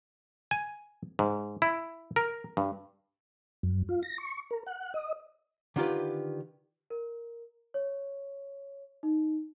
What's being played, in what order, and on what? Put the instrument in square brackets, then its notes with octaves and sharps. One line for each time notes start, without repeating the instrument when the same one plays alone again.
[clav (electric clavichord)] G#5
G#2
E4
A#4
G2
[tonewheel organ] F#2
F4
A#6
C#6
A#4
F#5
D#5
[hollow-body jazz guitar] D3 D#3 F4 G4 B4
[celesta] A#4
C#5
D#4